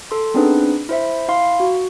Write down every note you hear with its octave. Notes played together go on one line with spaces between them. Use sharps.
A4 C6
B3 C4 D4 D#4 G#4 B4
E4 C5 E5
E4 F5 C6
F#4